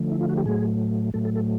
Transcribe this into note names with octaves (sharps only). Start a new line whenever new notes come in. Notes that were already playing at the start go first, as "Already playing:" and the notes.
Already playing: D3 F3 A3
E4
F4
F#4
G4
A2 F#3 A3 G#4
A2 F#3 A3 A4
A4
A4